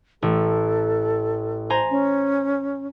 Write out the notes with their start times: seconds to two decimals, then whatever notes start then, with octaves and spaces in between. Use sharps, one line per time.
0.22 A1 A4
1.70 C5 G#5 A#5
1.90 C#4